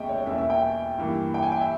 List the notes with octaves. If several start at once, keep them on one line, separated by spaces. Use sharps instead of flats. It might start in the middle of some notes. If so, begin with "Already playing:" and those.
Already playing: D#2 C#3 G#3 B3 D#5 E5 G5
C#5
E2 B2 A#3 E5
E5
G5
G2 E3 A#3
G5
G#5
G5
E5